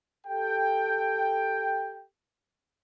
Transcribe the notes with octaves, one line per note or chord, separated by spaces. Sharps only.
G4 A4 G5